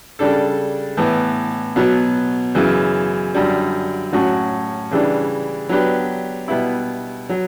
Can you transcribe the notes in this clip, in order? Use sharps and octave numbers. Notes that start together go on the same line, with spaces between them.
C#3 G3 D4 A4
A2 E3 B3
B2 F#3 B3
F#2 C#3 E3
F#2 D3 G3
A2 F#3 C#4 F#4
C#3 E3 G3 D4
F#3 B3 D4 G4 B4
B2 G3 B3 E4
F#3